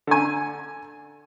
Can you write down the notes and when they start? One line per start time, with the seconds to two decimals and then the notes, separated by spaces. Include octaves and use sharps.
0.07 D3 G#5